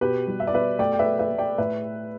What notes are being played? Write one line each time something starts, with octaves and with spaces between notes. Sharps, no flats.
B2 G4 B4
G3
E5
D5
B2 B4 E5
A3 D5 G5
G5
B4 E5
A3
B4 E5
A3
D5 G5
A2 B4 E5